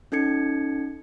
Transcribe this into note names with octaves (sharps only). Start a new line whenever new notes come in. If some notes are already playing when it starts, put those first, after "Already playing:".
C#4 D#4 A4 G#6 C#7